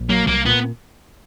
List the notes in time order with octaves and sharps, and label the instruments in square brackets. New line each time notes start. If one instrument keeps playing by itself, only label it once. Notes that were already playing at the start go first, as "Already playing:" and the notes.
Already playing: [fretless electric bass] A#1
[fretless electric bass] F#3 [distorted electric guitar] A#3
[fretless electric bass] C2 [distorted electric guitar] A#3
[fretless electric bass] A#2 [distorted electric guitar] B3